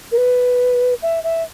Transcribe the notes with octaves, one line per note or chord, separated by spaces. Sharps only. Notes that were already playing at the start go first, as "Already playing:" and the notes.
A#4
B4
E5
E5